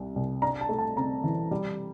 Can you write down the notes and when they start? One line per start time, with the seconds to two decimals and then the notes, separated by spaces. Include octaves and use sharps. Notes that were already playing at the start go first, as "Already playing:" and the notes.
Already playing: C2 G3
0.16 C2
0.42 D4 A#5
0.61 A5
0.69 A3
0.78 A5
0.97 C3 A#5
1.24 E3
1.51 G3